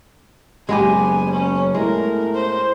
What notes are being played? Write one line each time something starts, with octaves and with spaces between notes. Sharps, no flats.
F#1 G#3 B3 G4 G#5
C#4
A2 G#3 A#4
C5